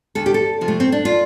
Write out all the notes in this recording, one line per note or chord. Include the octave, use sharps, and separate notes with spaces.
D2 A4
G4
A4
C3 F3
A3
C4
D4
F4